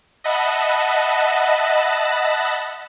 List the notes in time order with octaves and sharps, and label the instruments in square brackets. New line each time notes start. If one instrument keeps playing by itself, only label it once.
[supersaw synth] D#5 E5 F#5 A5 B5